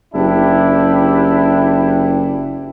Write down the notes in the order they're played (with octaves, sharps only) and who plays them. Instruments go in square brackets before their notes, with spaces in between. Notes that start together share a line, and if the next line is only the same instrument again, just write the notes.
[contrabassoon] F#1 [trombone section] D4 E4 G4